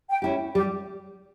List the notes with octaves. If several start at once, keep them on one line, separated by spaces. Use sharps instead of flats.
G5
C#4 E4 G4
G3 G4